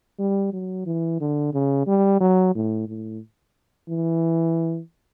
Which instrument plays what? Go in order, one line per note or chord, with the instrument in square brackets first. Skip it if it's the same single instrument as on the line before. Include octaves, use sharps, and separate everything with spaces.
[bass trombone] G3
F#3
E3
D3
C#3
G3
F#3
A2
A2
E3